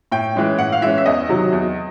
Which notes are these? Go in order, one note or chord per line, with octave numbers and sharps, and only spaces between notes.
A2 G5
E3 G#3 C#4
A2 F#5
F5
E3 G#3 C#4 E5
E5
E2 D#5
C3 D#3 F#3
E2